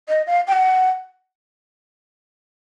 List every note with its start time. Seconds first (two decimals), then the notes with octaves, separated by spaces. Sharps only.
0.09 D#5
0.27 F5
0.47 G5
0.52 F#5